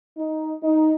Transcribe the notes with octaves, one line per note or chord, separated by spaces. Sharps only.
D#4
D#4